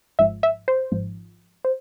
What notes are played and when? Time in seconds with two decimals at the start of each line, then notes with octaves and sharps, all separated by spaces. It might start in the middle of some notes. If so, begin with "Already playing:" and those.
0.19 G#1 G#2 F3 E5
0.43 E5
0.68 C5
0.92 G#1 G#2 F3
1.65 C5